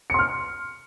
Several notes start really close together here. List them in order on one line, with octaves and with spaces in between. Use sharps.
C#7 C6 F6